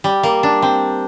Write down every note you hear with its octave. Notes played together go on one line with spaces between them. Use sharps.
G3
A#3
D4
C4